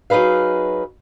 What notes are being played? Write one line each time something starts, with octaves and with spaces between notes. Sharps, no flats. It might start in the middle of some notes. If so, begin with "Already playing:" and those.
F#3 D#4 G#4 B4 F5